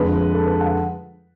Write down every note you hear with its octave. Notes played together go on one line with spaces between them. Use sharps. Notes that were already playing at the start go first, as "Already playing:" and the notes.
Already playing: F2 D3 G#3 B4
A4
B4
F#5